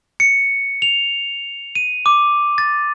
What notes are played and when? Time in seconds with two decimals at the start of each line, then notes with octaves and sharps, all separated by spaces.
0.20 C#7
0.82 F7
1.75 D#7
2.06 D6
2.58 A6